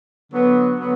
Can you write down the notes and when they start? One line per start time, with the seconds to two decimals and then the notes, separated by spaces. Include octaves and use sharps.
0.32 D3 F#3 B3
0.79 D3 F#3 B3